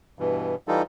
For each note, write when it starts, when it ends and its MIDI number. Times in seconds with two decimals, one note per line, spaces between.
0.19 0.55 43
0.19 0.55 47
0.19 0.55 52
0.68 0.82 52
0.68 0.82 55
0.68 0.82 63
0.68 0.82 65
0.68 0.82 69